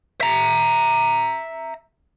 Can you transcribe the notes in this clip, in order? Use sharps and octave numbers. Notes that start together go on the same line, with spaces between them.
E5 A#5